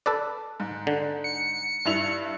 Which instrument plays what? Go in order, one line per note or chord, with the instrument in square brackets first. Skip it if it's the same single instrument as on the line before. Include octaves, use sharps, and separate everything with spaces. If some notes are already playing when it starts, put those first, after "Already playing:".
[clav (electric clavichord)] A4 B4 D5
[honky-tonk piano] G#2
[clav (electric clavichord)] D3
[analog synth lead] C#7
[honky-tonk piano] G2 E4 F7